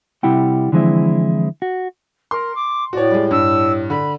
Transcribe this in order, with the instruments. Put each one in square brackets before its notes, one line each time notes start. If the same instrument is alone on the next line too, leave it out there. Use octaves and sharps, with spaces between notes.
[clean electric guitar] C3 G3 E4 F#5 G5
D3 E3 F3 G#3 C4 E4
F#4
[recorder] A#4 [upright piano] C6
[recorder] D6
[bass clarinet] A2 [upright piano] F#4 C#5 [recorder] D5
[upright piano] G3 G#3
[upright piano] G2 [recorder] E6
[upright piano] D3 [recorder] B5